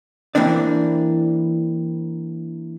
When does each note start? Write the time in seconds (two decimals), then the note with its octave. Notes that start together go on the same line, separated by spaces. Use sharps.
0.35 E3 A#3 C4 D4 D5